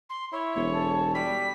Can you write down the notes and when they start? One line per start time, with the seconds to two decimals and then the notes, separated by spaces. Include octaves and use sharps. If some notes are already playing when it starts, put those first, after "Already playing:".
0.10 C6
0.32 E4 C#5
0.56 E1
0.74 A4
1.15 G3 B6